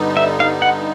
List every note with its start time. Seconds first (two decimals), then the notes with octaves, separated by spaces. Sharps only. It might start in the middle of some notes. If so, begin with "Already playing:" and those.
Already playing: G2 D3 G3 B3 D#4
0.17 E5
0.40 F5
0.62 F#5